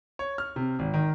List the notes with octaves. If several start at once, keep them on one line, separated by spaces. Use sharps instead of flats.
C#5
F6
C3
G#1
D#3